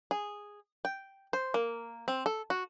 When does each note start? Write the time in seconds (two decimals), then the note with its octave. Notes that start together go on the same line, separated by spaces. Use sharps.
0.11 G#4
0.85 G5
1.33 C5
1.54 A#3
2.08 C4
2.26 A4
2.50 F#4